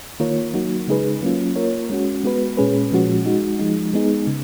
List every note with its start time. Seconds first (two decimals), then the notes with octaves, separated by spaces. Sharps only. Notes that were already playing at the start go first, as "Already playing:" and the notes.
0.20 D#3 A#3 F4 A#4 C#5
0.54 F#3 A#3 D#4 F#4
0.88 C#3 G#3 D#4 G#4 B4
1.22 F#3 A#3 C#4 F4
1.56 A#3 F4 A#4 C#5
1.90 G#3 C#4 F#4
2.24 G#3 B3 F#4 B4
2.57 A#2 G#3 C#4 G#4 B4
2.91 A#2 F3 G#3 C#4 F#4
3.25 G#3 D#4 F#4
3.59 F3 G#3 D#4
3.93 G#3 B3 D#4 G#4
4.27 C#3